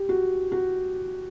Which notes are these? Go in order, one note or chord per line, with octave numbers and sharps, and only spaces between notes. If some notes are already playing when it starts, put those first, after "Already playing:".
Already playing: G4
F#4
F#4